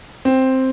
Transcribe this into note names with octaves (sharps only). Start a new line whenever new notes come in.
C4